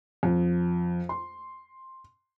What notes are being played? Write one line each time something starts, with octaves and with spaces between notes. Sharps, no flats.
F2
C6